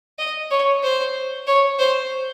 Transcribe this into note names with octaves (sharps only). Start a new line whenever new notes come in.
D#5
C#5
C5
C#5
C5